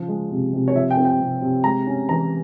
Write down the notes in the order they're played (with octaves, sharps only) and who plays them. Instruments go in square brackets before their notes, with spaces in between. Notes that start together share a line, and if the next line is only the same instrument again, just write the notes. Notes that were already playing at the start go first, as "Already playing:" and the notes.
Already playing: [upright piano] C#3 F3
G#3
C3
C3
C#5
F3 E5
G5
C4
G5
C3
C3
G#3 A#5
C#4
E3 A#5